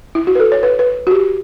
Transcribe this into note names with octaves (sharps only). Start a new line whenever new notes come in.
E4
F#4
B4
A4
C#5
B4
B4
F#4
G4